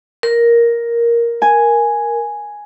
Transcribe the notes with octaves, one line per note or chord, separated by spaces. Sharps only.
A#4
G#5